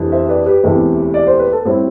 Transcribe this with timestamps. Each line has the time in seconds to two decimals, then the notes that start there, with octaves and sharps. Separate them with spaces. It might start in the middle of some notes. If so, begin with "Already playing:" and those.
Already playing: F2 C3 E3 A3 D4
0.12 C5 E5
0.29 B4 D5
0.46 G4 B4
0.63 E1 D2 C3 E3 A3
1.14 D5
1.27 C5
1.39 B4
1.53 A4
1.65 A2 G3 C4 E4 G4